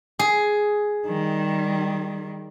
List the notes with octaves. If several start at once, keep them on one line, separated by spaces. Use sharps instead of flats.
G#4
D#3 G3